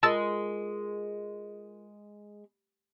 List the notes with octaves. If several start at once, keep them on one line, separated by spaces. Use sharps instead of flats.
G#3 F4 A#4 D#5 A5 E6 A6